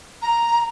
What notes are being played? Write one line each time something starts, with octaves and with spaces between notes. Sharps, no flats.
A#5